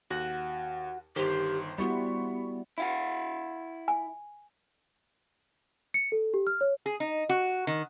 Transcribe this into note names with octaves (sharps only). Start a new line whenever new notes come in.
D#2 F#4
G1 D#3 G4 C5
G3 B3 E4 F#4 B5 C#6
E4 F5 F#5
G#5
C#7
A4
G4
F6
C#5
G#4
D#4
F#4
D#3